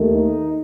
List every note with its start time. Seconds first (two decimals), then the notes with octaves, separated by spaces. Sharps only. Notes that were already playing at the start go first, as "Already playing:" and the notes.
Already playing: D#2 D#3 A3
0.13 D#4